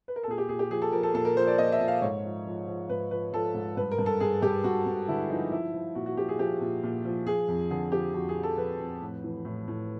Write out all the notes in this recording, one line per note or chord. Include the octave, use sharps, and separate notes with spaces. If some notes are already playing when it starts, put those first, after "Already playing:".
B4
A#4
A4
A#2 G#4
G4
A#2 G#4
G4
F3 G#4
A4
F3 A#4
A4
A#2 A4
A#4
F3 C5
D5
A#2 D#5
E5
A#2
F5
G#2 C#5
F3
F3
F3
G#2 B4
F3 B4
F3 A4
G#2
G2 B4
A#4
G2
A4
G2 G#4
G2 G4
G2 F#4
G2
D3 E4
F3 D#4
F3 E4
F3
A#2 F#4
F#4
F3 G4
G#4
F3 G4
A#2
A#2
F3
F3 G#4
F2
D3 G#4
F3 G4
F2 F#4
G#4
F3
A4
F2 B4
F2
A2
E3
A2
A2